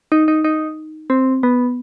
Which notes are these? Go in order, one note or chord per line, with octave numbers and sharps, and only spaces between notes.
D#4
D#4
D#4
C4
B3